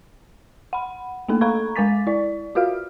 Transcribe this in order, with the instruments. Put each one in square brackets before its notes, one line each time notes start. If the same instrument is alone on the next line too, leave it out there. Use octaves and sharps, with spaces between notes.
[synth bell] F#5 B5
A3 A#3 D4 A4
A4 F5 A#5 B5 C#6 G#6
G#3 A#4 G#5 D6 A6 B6
E4 D5
F4 F#4 A#4 F5 F6